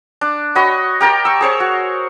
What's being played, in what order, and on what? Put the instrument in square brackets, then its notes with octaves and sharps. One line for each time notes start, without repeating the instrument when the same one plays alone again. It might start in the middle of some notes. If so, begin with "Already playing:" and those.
[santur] D4
F#4 C#5 D#5 B5
G4 A#4 G5 A5
C#6 E6
G#4 C5 C#5 C#6
F#4